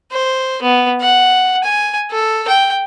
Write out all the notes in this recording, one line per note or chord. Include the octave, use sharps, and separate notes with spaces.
C5
B3
F#5
G#5
A4
G5